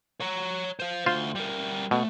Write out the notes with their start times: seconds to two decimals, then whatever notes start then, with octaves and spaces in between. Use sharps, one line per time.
0.20 C#5 A#5
0.80 C5 F5
1.06 D2 F4 C5 C6
1.35 G3 A#4
1.91 B2 A3